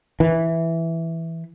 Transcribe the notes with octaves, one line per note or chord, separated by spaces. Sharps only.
E3